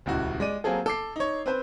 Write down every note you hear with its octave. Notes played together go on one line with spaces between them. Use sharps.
D#1 C#2 E4 F#4
G#3 D5 D#7
F#3 A#3 C4 G#4 A4
A4 D6 C7
D#4 C#5
C4 B4 C5